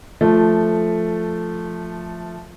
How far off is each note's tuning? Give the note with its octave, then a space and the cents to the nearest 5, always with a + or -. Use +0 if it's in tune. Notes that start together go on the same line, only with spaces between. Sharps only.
F3 +0 A3 +0